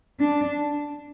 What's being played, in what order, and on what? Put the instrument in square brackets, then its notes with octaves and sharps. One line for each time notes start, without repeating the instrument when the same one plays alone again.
[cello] D4